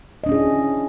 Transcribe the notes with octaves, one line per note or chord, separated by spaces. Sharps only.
C#4 D4 E4 G#4 D#5